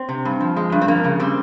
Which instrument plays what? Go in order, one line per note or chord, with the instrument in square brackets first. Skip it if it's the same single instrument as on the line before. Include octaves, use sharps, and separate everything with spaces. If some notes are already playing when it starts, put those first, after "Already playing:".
Already playing: [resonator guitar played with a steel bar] C4
C3
G2
F3
G#3
G2
C4
F2 A#3
C#3
G3 C4